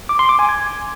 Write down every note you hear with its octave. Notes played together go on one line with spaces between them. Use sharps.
D6
C6
D6
G#5
G#6